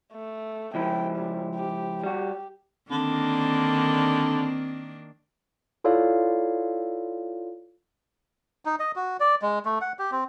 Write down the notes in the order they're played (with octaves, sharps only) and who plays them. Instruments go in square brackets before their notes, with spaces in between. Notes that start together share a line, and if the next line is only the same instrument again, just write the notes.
[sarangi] A3
[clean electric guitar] C#2 F3 E4 [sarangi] G5
[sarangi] G3
G4
[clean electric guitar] G3 F#4 [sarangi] G4
[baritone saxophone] D3 [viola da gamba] D#3 A#3 D4 [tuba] C4
[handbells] E4 F4 A4 C#5 D5 F5
[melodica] D#4
D#5
F#4
D5
G#3
A3
F#5
G4
C4